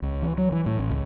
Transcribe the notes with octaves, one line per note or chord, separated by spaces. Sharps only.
C#2
E3
F#3
E3
A2
A1
C#2